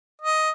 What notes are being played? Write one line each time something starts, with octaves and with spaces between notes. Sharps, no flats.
D#5